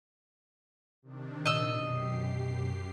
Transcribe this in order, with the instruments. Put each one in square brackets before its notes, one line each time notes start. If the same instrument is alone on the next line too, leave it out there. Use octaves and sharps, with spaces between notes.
[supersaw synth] C3 D#3 D4
[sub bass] A#2 [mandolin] D#5 E6
[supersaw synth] F#2 G4 C7 [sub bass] B2